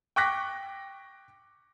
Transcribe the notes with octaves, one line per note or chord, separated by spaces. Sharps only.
G5 C#6 D6 F#6 A#6 B6